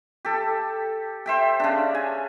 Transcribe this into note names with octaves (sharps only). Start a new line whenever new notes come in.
G4 A4
C5 E5 G5
C#3 D4
G#5